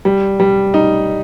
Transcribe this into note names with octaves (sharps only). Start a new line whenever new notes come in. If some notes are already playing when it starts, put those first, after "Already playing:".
G3
G3
D#4